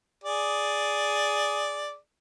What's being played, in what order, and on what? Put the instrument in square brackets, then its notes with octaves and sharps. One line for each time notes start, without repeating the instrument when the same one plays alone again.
[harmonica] G#4 D5